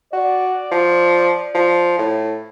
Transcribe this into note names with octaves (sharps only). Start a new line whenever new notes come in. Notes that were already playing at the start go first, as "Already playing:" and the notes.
F#4 D5
F3
F3
A2